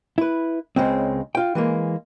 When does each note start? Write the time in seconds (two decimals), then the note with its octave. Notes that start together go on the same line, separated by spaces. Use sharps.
0.18 E4 B4
0.76 C#2 C#3 G#3 C4
1.35 F4 G5
1.55 E3 G#3 A#3